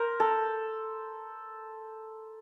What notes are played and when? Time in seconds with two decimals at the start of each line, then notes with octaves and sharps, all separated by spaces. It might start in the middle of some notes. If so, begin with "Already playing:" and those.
Already playing: A#4 C5
0.20 A4